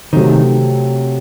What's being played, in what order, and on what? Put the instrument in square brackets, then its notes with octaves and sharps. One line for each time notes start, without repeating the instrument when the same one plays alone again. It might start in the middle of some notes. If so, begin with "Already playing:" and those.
[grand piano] C3 F#3 A3 C4 [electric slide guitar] D#3